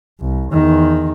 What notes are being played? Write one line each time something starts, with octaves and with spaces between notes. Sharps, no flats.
C2
E2 D#3